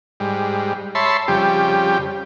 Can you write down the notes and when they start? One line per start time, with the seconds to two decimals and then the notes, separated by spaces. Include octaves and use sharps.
0.20 G#2 G3
0.95 C#5 E5 A5 B5 C6
1.28 F2 C#3 G3 G4